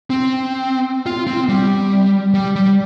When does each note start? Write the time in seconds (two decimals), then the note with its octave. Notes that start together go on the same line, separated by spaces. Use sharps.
0.10 C4
1.06 F4
1.27 C4
1.49 G3
2.34 G3
2.56 G3